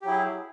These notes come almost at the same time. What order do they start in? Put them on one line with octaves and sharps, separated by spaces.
G4 F#3 E4 G#4